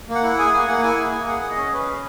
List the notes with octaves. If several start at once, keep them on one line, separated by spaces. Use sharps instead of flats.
A#3
F#5
E4
G#4 G#5
F#5
A#3 G#5
A#3 F#5
E4 G#5
G#4
A#3
G#4 F#5
G#4
D#5
C#4
C#4 B4
G#4